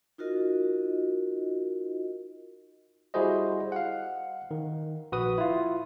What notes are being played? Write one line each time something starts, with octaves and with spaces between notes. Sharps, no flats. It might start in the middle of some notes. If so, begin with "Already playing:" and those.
D#4 F4 F#4 A#4 D#5
G3 E4 F#4 G#4 C5 D#5
F5 F#5
D#3
A#1 F#4 B4 D#6
E4 F4